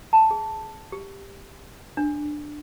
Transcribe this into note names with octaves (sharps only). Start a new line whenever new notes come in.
A5
G#4
G4
D4